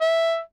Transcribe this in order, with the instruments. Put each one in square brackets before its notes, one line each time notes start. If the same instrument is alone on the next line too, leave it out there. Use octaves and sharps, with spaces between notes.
[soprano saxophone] E5